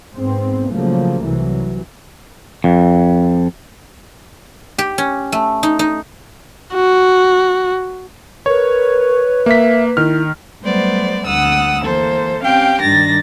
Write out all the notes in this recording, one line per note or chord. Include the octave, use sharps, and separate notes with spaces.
G#2 B3 C4
A#2 C#3 F3 F#3 A3 A#3
C2 C3 E3 F#3
F2
G4
C#4
A3
D#4
D#4
F#4
A#4 B4 C#5
A#3 E5 B6
D#3 E4 F6
F#3 G3 A3 B3 C5 D5
D2 F#5 D#6 E6
E3 A#3 A4 C5
C4 C#4 G4 F5 G5
G2 D#3 D4 A6 A#6